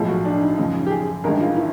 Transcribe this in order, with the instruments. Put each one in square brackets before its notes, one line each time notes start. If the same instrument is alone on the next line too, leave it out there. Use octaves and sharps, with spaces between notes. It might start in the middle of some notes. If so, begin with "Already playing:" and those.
Already playing: [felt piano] B1 A2 F3 G#3
[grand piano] F#4
D4
D#4
[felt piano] F#2 C#3 F3 [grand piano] D#4
[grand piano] G4
G#4
[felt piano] A1 G2 D#3 G#3 [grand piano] A#4
[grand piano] F4
E4